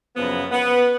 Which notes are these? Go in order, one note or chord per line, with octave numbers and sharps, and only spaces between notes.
F#2 C#3 F3 B3
B3